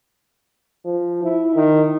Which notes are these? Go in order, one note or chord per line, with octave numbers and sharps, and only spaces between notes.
F3
E4
D#3